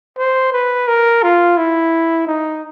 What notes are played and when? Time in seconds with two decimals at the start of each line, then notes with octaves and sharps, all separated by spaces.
0.18 C5
0.52 B4
0.88 A#4
1.23 F4
1.57 E4
2.27 D#4